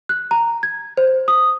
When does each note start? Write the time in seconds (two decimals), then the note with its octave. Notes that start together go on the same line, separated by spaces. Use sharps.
0.09 F#6
0.31 A#5
0.63 G#6
0.97 C5
1.28 D#6